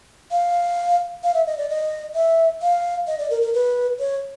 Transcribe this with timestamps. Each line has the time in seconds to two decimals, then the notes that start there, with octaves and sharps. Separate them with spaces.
0.31 F5
1.23 F5
1.34 E5
1.47 D#5
1.58 D5
1.69 D#5
2.15 E5
2.62 F5
3.07 D#5
3.19 D5
3.30 A#4
3.42 A#4
3.54 B4
3.99 C#5